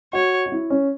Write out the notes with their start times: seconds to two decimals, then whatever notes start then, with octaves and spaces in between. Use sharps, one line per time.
0.13 F#4 C#5
0.46 F#4
0.52 E4
0.70 C#4